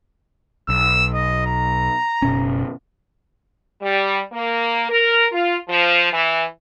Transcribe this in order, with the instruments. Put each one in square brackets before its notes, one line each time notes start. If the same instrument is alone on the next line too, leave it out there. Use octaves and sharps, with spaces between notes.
[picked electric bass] B1 [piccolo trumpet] E6
[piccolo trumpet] D#5
A#5
[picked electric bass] F#1 B2 C#4
[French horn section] G3
A#3
A#4
F4
F3
E3